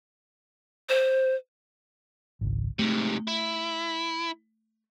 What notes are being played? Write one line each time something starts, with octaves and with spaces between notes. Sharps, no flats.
C5
G#1 C#2
G#2 C3 A3
E4